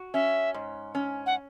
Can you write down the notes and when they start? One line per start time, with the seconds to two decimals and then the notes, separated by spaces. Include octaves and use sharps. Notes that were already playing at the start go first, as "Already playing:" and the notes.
Already playing: F#4
0.14 C#4 E5
0.54 G#2
0.95 C#4
1.26 F#5